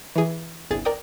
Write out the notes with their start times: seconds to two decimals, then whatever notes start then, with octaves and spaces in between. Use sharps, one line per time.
0.16 E3 G#4
0.71 G1 C2 G#4 A6
0.85 A#4 D5 G5 D#6